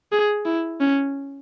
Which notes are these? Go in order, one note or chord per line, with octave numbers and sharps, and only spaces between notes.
G#4
E4
C#4